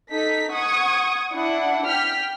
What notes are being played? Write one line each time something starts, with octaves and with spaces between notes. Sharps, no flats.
D#4 A4 B6
F#5 C#6 D#6 G#6
D4 E4 F#5
G5 F6 B6